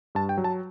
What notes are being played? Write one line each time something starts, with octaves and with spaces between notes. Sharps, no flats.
G2 A5
G5
F#3
A5